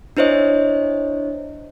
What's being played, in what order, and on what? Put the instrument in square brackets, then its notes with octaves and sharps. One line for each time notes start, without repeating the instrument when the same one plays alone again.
[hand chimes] D4 E4 C5 C#5 D#5